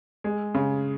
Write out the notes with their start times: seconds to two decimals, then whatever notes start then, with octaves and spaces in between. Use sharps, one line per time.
0.24 G#3
0.54 C#3